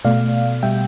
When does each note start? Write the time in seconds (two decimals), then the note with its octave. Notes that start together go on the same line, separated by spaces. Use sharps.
0.05 B2 A3 D5 F5
0.63 B2 G3 E5 G5